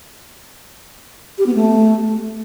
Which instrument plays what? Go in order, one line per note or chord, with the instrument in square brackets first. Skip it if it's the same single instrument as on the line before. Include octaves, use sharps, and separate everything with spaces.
[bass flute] G4
B3
A3